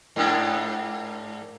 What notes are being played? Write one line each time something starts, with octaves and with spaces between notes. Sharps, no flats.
G#2 A#3 D4